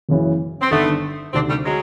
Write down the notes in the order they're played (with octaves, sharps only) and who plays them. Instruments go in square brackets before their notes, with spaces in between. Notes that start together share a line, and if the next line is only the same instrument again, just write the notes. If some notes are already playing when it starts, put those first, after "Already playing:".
[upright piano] F#1 F#2 C#3 E3
[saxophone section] C4
[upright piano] G1 G2 D#3 [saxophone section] A3 B3
[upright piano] D2 C3 D#3 [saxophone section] C4 D4
[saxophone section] G3 A3
F#3 G#3